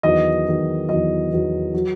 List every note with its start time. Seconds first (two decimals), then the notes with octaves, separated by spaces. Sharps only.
0.03 E2 D#3 F#3 D#5
0.47 E2 D#3 F#3
0.89 E2 D#3 F#3 D#5
1.31 E2 D#3 F#3
1.74 F#3